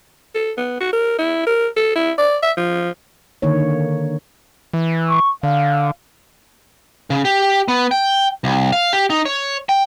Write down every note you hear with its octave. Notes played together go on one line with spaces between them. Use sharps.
A4
B3
F#4
A#4
E4
A#4
A4
E4
D5
E5
F3
D3 D#3 A#3 C#5
E3
C#6
D3 F5
C#3
G4
B3
G5
C2
F5
G4
D#4
C#5
G5